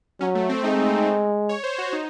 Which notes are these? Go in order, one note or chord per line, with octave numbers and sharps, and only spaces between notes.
F#3 C#4
A3
C4
G#3 D#4
C#5
C5
F#4
D#4